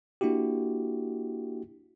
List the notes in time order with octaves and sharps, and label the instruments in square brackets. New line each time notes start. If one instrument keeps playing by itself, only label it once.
[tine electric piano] A#3 D4 E4 F#4 G4